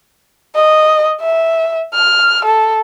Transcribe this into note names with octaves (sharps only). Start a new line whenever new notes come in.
D#5
E5
F6
A4